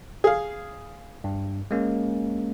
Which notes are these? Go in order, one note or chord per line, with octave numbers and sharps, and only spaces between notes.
G#4 F5
G2
G#3 A#3 C#4